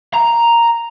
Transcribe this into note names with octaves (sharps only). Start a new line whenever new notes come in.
A#5